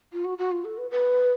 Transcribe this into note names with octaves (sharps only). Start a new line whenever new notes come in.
F4
F#4
F#4
F4
A4
B4
B4